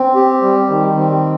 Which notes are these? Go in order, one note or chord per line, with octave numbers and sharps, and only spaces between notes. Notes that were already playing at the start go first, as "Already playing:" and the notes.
Already playing: C4
G4
G3
D#3
C4